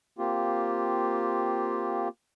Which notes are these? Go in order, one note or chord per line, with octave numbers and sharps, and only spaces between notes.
A#3 C4 F4 G4